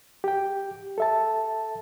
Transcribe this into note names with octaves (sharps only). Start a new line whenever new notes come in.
G4 G5
A4 E5 A5